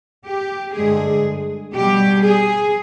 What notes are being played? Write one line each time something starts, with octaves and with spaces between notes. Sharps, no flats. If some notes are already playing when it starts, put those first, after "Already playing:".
G4
G2 D3 G#3 G#4
B2 G3 G4
G#4